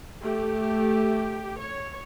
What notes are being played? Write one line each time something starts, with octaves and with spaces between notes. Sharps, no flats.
A3 G4
C#5